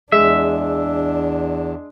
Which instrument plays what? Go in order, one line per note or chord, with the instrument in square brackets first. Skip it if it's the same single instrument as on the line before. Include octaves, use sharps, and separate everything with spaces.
[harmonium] E2 [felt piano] G#3 [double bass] D4 [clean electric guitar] E5